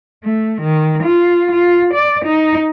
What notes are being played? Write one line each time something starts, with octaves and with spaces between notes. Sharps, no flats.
A3
D#3
F4
F4
D5
D#4